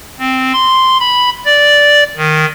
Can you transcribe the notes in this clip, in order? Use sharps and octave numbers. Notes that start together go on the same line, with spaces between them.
C4
C6
B5
D5
D#3